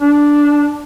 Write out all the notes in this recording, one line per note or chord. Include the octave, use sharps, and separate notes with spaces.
D4